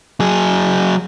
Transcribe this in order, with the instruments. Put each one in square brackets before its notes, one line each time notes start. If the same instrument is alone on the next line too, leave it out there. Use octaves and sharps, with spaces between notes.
[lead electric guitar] F#3 G#4